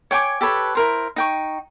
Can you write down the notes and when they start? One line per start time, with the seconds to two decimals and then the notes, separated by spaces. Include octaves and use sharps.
0.11 C#5 G5 G#5 D6
0.41 G4 A4 B4 C#5
0.75 E4 A#4 C5
1.16 D#4 G5 C#6